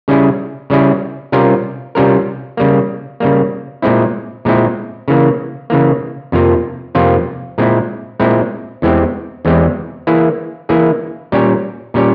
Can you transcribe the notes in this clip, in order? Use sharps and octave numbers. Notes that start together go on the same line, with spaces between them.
C#3 G3 C#4 E4 G#4
C#3 G3 C#4 E4 G#4
C3 G3 C#4 F4 A#4
C3 G3 C#4 F4 A#4
C#3 G3 A#3
C#3 G3 A#3
A#2 G#3 C4 E4
A#2 G#3 C4 E4
C#3 E3 A#3
C#3 E3 A#3
F2 C3 F3 A#3 F4
F2 C3 F3 A#3 F4
A#2 G#3 C4 E4
A#2 G#3 C4 E4
E2 E3 G#3 C4 G4
E2 E3 G#3 C4 G4
E3 A#3 E4 G#4
E3 A#3 E4 G#4
A#2 G3 C#4 G4 C#5
A#2 G3 C#4 G4 C#5